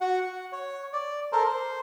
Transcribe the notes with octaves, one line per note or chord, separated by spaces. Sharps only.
F#4 F#5
F#5
C#5
D5
A4 A#4 C5
C5